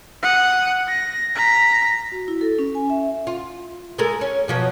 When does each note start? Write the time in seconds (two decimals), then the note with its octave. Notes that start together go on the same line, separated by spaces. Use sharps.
0.23 F#5 D#6
0.88 A#6
1.35 A#5 B6
2.12 F#4
2.28 E4
2.41 A4
2.59 C#4
2.75 G#5
2.90 E5
3.27 F4
3.98 G#3 A4 A#4
4.21 C#4
4.48 B2 F3 F#3